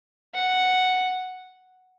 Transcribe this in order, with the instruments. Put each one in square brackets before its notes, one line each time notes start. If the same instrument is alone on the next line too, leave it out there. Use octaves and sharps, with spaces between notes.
[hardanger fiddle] F#5